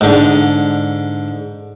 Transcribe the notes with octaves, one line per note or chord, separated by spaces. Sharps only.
G#2 D3